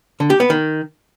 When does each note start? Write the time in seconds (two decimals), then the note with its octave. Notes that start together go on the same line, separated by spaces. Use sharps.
0.20 D3
0.30 G4
0.40 B3
0.50 D#3